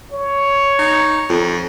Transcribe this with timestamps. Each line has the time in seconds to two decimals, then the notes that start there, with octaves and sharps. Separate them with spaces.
0.12 C#5
0.79 D#4
1.30 F2